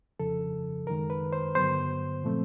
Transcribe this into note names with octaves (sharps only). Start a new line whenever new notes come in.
F2 C#3 F3 A4
F#2 D#3 G#3 A#4
B4
C5
G2 D3 F#3 B3 C5
A#2 F3 A3 C4